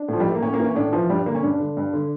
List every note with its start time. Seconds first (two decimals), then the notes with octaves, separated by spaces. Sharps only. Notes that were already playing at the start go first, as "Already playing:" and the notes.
Already playing: D4
0.08 A2 F3
0.20 G3
0.26 E3 A3
0.35 A#3
0.42 A2 C#4
0.54 A#3
0.60 E3
0.65 C#4
0.76 A2 D4
0.93 E3 F3
1.10 G2 G3
1.26 D3 A#3
1.35 C#4
1.43 G2 D4
1.60 D3
1.77 G2
1.94 D3